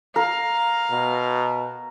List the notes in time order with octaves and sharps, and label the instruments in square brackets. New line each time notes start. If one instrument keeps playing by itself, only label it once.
[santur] A#4 [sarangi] F5
[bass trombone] B2